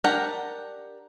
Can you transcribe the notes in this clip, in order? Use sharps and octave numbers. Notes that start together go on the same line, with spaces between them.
D4 G4 A#4 F#5 A#5